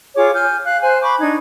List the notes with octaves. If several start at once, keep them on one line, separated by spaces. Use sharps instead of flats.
F4 G#4 C#5 D6
G#5 F6 G6
F5 F#6
C5 G#5 F#6
B5 C#6 D6
D4 D#4 G#6